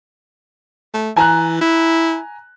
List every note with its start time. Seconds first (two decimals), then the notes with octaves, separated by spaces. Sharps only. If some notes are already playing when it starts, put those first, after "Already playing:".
0.94 A3
1.16 E3 G#5 A#5 F#6
1.61 E4